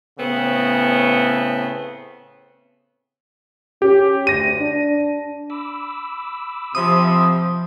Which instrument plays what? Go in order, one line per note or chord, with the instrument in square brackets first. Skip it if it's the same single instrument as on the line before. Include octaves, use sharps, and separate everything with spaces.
[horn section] A2 C#3 B3 C4
[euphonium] C#4 [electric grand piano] G4
[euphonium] D2 [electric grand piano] A#6 D#7
[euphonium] D4
[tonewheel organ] B5 D6 E6
[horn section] C3 [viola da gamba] F3 [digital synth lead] D#6